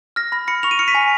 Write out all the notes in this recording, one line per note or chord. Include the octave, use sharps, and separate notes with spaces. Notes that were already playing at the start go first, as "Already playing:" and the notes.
F6 A#6
B5 A#6
B5 A#6 C#7
C#6 F7
D#7
F6 C#7
B6 D#7
G#5